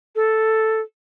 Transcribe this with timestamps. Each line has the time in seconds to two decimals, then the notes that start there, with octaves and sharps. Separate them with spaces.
0.16 A4